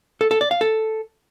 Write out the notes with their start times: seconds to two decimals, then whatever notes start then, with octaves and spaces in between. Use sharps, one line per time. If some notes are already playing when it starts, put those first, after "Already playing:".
0.21 A4
0.31 A4
0.41 D5
0.51 F5
0.61 A4